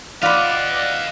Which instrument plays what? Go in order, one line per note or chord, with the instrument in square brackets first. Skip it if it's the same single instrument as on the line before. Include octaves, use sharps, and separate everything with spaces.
[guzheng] F4 B4 [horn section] D5 [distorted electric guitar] D#5 F5 [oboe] F#5